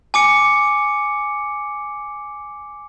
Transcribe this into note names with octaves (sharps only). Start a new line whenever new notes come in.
G#5 D6 C#7